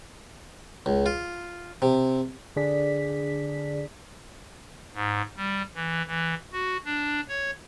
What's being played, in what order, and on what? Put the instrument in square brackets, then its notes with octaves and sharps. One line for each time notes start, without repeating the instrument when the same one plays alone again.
[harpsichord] C#2
F4
C3
[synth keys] D3 D4 G#4 D5 B6
[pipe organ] G#2
G3
E3
E3
F#4
D4
C#5